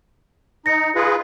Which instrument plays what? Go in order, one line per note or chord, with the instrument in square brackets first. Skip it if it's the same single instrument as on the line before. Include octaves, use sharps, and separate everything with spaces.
[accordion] D#4 [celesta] A#6 C#7
[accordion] F4 G#4 B4